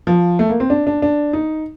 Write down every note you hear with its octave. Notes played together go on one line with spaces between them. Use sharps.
F3
A3
A#3
C4
D4
D4
D4
D#4